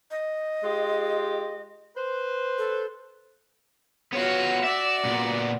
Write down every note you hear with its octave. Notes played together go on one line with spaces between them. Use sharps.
D#5
G#3 F4 G4
B4 C5
A4
B3 F4 F#4 C#5
F#4 D5 E5
A#2 B3